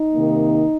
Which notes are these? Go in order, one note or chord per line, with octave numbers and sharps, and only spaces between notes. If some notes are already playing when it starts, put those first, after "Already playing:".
Already playing: D#4
C3 D#3 A#3